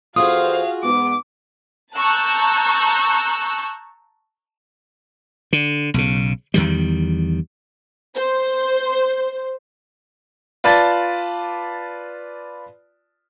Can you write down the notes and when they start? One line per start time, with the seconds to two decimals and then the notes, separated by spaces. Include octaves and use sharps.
0.16 E2 F4 F#4 G#4 A4 C5 F5 D#6
0.83 G#2 B3 D6
1.95 A5 A#5 C#6 E6 F#6 G6
5.53 D3
5.94 B1 C#3
6.54 E2 D#3 G3
8.16 C5
10.64 F4 B4 D5 A5 A6